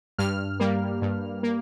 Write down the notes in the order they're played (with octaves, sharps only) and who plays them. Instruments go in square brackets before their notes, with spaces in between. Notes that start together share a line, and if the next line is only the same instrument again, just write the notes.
[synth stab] G2 F6
G3 A#3
G2
A#3